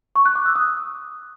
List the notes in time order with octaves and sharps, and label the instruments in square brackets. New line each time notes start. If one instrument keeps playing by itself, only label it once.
[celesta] C#6
F#6
D6
E6
D#6